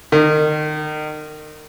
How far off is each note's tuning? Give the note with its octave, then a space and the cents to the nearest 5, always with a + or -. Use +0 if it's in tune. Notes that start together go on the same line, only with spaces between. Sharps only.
D#3 -30